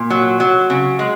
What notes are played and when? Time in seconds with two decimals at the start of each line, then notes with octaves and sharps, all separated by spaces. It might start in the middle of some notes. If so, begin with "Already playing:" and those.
Already playing: A#2
0.10 F#3
0.40 F#3
0.70 C#3
0.99 G#3